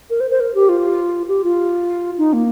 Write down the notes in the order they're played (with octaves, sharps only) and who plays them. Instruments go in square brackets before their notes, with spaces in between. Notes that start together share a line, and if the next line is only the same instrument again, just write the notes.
[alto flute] A#4
C5
C5
A#4
G4
F4
G4
F4
D#4
A#3